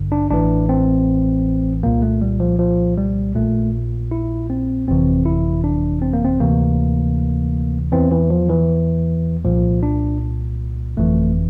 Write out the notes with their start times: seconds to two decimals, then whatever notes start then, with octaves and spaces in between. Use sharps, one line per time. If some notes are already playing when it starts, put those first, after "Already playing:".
Already playing: A1 G2 D3
0.12 D4
0.31 A1 A2 E3 D4
0.69 C4
1.83 C2 A#2 A#3
2.02 A3
2.22 G3
2.40 F3
2.59 F3
2.98 G3
3.35 A#1 A#2 A3
4.11 E4
4.50 C4
4.87 G1 F2 C3 E3 C4
5.26 E4
5.64 D4
6.02 C4
6.13 A#3
6.25 C4
6.40 D2 C3 E3 A#3
7.92 E2 E3 C4
8.11 E3
8.30 F3
8.50 E3
9.45 C2 A#2 F3
9.83 D4
10.97 G1 F2 E3 A3